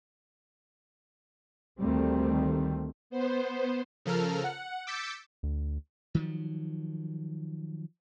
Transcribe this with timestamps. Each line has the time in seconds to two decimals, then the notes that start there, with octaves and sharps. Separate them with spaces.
1.80 D2 D#3 G3 A3 C4
3.10 B3 C5
4.05 C#3 F3 A4 A#4 F6
4.44 F#5
4.87 D6 E6 G6 A6 B6 C#7
5.43 D2
6.15 D#3 F3 F#3